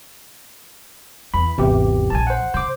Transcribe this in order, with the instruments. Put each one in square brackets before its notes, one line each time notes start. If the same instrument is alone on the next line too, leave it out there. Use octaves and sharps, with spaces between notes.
[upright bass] E2 [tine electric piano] B5
[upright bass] G#1 [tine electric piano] E2 C3 G4
[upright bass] A#1 F2 [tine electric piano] G#5 A5
[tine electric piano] C5 F#5
[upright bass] C#3 [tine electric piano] C5 D6